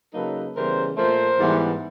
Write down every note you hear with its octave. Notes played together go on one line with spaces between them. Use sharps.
C#3 F#3 A#3 D#4 A4 B4
C#3 E3 G3 B3 A#4 C5
A#2 F3 A3 A#4 C5
G#2 E3 G3 B3